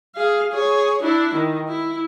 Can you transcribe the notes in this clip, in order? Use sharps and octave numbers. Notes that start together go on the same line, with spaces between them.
G#4 F5
G#4 C#5
D4 E4
D#3
E4